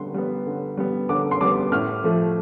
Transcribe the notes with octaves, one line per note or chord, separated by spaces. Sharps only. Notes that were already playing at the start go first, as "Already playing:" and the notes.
Already playing: D3 G3 B3 C6
G3 B3
D3
G3 B3
D3 D6
C6
G3 B3 D6
A2 F6
F3 A3